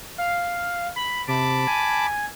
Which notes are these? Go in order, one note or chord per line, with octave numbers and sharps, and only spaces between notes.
F5
B5
C3 A5 B5 D6
G#5